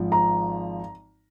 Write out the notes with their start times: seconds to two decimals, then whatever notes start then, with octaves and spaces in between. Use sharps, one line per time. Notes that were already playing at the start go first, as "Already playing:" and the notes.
Already playing: G#1 F3
0.12 A#5